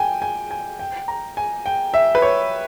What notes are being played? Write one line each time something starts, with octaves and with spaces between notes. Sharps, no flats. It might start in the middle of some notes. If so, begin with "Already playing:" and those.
Already playing: G5 G#5
G#5
G#5
G5
A#5
G#5
G5
E5
B4
C#5